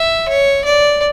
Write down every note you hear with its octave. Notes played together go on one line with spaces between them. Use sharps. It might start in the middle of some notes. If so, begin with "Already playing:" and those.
Already playing: E5
C#5
D5